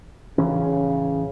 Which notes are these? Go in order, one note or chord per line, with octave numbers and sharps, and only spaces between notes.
A1 C#3 E3 C#4